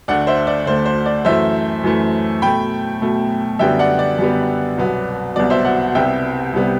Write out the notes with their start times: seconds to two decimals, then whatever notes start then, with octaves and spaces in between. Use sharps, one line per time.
0.08 D2 D3 A3 D5 F#5
0.27 C5 E5
0.47 D5
0.66 D2 D3 A3 C5
0.86 C5
1.06 D5
1.25 F#2 E3 A3 C5 E5
1.84 F#2 E3 A3
2.42 B2 A3 G5 B5
3.02 B2 A3
3.59 F#2 D3 G3 B3 E5 G5
3.79 D5 F#5
3.99 D5
4.18 F#2 D3 G3 B3
4.77 C2 B2 F#3 B3
5.36 C2 B2 F#3 B3 D5
5.50 C5 E5
5.65 D5 F#5
5.95 C2 C3 G3 B3 E5 G5
6.53 C2 C3 G3 B3